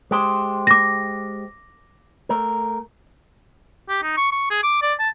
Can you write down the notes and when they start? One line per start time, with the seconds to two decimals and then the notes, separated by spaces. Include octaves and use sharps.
0.11 G#3 G4 C5
0.67 D6 A#6
2.29 A3 A#4
3.89 G4
4.03 D#4
4.17 C#6
4.32 C#6
4.50 G#4
4.63 D6
4.82 D5
4.99 A5